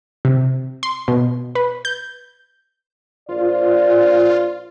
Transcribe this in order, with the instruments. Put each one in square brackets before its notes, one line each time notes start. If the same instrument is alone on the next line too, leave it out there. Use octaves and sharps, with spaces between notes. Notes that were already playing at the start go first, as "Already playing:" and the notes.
[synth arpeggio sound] C3
C6
B2
B4
G6
[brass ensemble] A#1 C5 D5 [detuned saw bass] F4